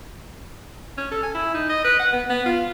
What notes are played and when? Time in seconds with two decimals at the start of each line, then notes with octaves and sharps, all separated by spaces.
0.98 C#4
1.11 A4
1.23 G#5
1.35 E4
1.54 D#4
1.70 D#5
1.85 B4
1.99 F#5
2.13 B3
2.30 B3
2.46 F4